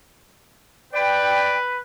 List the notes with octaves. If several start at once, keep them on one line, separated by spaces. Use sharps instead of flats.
B4 D5 G5